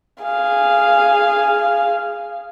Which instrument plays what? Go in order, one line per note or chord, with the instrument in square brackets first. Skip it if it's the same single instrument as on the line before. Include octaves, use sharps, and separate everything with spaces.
[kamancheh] G#4 F5